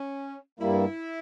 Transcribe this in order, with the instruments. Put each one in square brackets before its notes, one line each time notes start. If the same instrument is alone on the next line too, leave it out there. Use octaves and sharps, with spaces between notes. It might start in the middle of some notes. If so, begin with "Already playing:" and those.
Already playing: [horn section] C#4
[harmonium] G2 G3 A#3 [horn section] E4